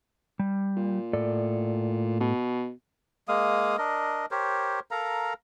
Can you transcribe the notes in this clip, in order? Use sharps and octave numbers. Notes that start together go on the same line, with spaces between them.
G3
A#2
A2 A4 D5
B2
G#3 A#3 F5 D#6
D4 A#4 D#5
G4 A#4 C5 C#5
A4 A#4 F5 A#5